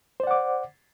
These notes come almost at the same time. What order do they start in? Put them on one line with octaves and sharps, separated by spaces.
C5 D5 F#5 D6